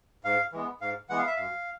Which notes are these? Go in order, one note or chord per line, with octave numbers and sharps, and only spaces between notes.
G#2 F5
E3 G#3 B3
G#2 F5
E3 G#3 B3 F#5
F5
E5
F#2 F5